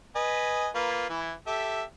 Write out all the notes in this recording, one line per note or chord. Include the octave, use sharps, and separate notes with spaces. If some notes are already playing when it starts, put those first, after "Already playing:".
B4 D#5 G#5
A#3 F4 B4
E3 E4
G4 A4 E5